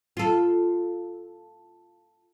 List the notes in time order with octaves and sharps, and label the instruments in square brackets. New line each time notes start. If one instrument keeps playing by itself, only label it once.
[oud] F4 A4